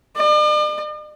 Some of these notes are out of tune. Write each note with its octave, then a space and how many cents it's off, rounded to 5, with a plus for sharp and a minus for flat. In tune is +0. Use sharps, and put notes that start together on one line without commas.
D5 +45